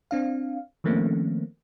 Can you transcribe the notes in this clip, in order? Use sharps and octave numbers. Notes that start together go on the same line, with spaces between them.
C4 D4 F5
D#3 F3 A3 A#3 C4 C#4